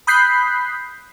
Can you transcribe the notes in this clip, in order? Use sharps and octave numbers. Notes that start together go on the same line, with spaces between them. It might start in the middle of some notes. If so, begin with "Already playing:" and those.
B5 D#6 F#6 G6 B6 C7